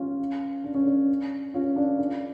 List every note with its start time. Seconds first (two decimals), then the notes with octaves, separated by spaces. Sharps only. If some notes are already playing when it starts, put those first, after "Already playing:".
Already playing: C#4 F4
0.64 D4
0.75 C#4
0.86 D4
1.54 C#4 F4
1.76 D4
1.98 D4